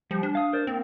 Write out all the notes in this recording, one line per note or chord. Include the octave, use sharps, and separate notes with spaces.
F3 G3
D4
F5 D#6
A#4 C5 D5
A#3 C4